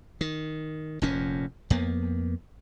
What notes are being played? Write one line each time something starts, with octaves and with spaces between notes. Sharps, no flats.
D#3
F1 F2 A#2 C#4
F2 A#3 B3